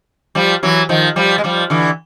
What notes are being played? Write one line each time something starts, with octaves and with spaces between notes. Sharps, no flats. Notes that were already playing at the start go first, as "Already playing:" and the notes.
F3 G3
E3 F#3
D#3 F3
F3 G3
G#3
F3 G3
D3 E3